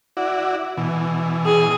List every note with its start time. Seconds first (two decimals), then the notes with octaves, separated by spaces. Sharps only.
0.17 E4 F#4 D5
0.77 B2 E3
1.45 G#4